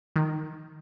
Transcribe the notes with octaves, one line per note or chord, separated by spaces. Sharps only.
D#3